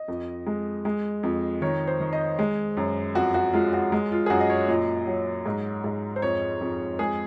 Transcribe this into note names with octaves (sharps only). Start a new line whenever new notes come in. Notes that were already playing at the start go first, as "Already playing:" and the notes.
Already playing: D#5
F2
G#3
G#3
F2
D#3 C#5
C5
D#3
D#5
G#3
F#2
F2 F#4
F#4
G#3 F4
F#4
G#3
F4
G#4
F#2 F#4
D#5
C#5
A#2 D#5
F#3
G#2
G#2
C5
F2 C#5
F2
G#3 G#4